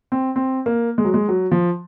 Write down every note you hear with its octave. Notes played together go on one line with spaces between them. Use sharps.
C4
C4
A#3
G#3
F#3
G#3
F#3
F3